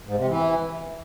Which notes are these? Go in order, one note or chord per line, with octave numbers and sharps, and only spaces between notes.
G#2
C3
E3